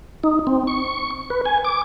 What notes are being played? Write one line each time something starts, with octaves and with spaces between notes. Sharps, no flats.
D#4
C4
C#6
B4
G#5
D6